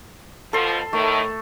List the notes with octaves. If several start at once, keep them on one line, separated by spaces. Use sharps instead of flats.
B2 F3 A4 C6
A2 D#3 A3